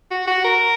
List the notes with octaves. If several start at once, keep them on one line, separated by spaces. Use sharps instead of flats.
F#4
F#4
A#4